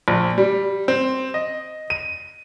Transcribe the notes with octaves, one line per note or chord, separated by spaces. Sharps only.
A#1
G3
C4
D#5
D#7